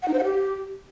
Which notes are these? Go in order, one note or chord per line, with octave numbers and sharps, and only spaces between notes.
F#5
D#4
C5
F#5
G4